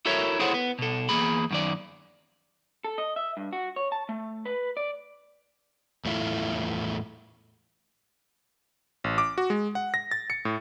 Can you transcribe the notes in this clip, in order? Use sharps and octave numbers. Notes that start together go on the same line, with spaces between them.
E4 F#4 A4 A#4 C#5 E5
E4 G#4 A4 C5 C#5 F#5
B3
B2 A4
E2 A#3 G#4 B5
F#2 D#3 D5
A4
D#5
E5
G2
F#4
C#5
A5
A3
B4
D5
E2 A2 A3 E4 F4
A1
D6
F#4
G#3
F#5
A#6
A6
C#7
A2